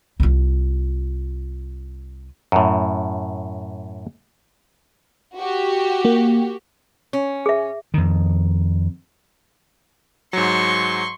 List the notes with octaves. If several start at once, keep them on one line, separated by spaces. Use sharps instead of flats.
C2 F4
F#2 A2
F#4 G4
A#3
C#4
G#4 E5
F2 D#3
G#2 F#3 C6 C#6